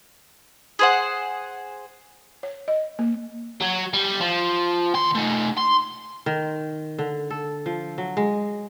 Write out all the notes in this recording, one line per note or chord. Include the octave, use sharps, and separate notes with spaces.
G#4 C5 F#5
C#5
D#5
A#3
F#3
G3
F3
D#2 C6
A3 D#4
C6
D#3
D3
A4
F3
F#3
G#3